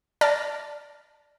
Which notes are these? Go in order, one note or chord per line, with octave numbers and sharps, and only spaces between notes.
D5 A5 F6 A6 A#6